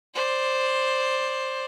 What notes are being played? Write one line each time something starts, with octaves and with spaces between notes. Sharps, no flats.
C5 D5